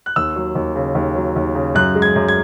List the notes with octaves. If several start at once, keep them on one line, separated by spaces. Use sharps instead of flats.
F#6
D#2 E6
F#3
D#2
C#3
D#2
F#3
D#2
C#3
F#2 F#6
G#3
G#6
F#2
G#6